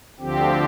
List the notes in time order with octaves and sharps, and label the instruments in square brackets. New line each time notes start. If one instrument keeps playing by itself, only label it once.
[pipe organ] D2 D3 F3 C4 G4